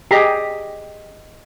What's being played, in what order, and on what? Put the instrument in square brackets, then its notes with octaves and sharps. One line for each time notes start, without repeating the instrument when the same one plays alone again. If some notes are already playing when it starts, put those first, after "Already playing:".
[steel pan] G4 G#4 A#5 [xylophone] D#5 B6 C7